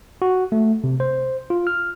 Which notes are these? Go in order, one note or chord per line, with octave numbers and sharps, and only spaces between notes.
F#4
A3
C3
C5
F4
F6